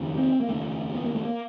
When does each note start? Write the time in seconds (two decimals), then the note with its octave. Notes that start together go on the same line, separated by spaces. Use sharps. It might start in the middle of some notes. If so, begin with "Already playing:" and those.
Already playing: F1 D#2 C#3
0.18 C4
0.40 A#3
0.47 F1 D#2 C#3 A3
0.95 B3
1.05 A#3
1.14 A3
1.25 A#3